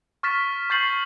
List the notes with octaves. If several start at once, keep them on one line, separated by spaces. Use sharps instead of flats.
C#6 F6 A6 B6 E7
C#6 G6 A6 C7 F#7